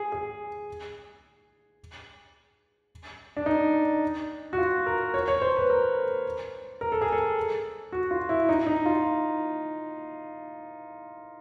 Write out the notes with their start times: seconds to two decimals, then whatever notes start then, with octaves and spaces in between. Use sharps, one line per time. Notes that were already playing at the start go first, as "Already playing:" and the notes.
Already playing: G#4
0.12 G#4
3.37 D4
3.46 D#4
4.53 F#4
4.58 F4
4.86 A#4
5.14 C#5
5.28 C#5
5.42 C5
5.56 B4
5.70 A#4
6.81 A#4
6.92 A4
7.01 G#4
7.12 A4
7.92 F#4
8.11 F4
8.29 E4
8.49 D#4
8.67 D#4
8.86 F4